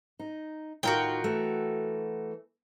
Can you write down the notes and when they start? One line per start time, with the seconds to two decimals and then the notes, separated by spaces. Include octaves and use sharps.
0.19 D#4
0.83 A2 D#3 F4 F#4 A#4 G5
1.24 E3 A3